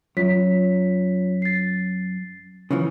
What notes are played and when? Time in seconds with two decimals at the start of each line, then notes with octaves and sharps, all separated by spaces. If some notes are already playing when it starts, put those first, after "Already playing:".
0.17 F#2 F4 C#5 B6
1.42 A6 C7
2.71 C#3 E3 F3